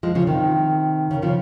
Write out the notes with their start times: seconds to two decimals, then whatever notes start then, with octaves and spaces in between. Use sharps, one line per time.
0.03 F3 G#3
0.15 C#3 F3
0.27 C3 D#3
1.11 C#3
1.22 C#3 F3